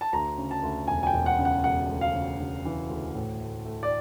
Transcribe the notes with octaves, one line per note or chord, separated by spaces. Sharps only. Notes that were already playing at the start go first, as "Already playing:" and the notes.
A5
D2 A#5
C#3
A5
D2
E1 G#5
G#5
G5
E1
F#5
C#3
F#5
E1 F#5
D2
F5
C#3
C#3
E3
D2
A2
A3
A3
D5